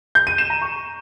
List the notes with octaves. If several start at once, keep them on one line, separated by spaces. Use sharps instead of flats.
G6
D#7
E7
A#5
C#6